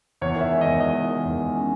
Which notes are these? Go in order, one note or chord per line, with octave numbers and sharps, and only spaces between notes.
E2 C#5
D#3
E5
G#3
D#5
E2
G#3 D#5
D#3
D#3
E2
G#3
C#4